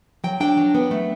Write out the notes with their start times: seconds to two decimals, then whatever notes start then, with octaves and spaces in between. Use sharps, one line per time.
0.24 F#3 G5
0.40 D4 G5
0.57 F#3
0.75 B3
0.91 A3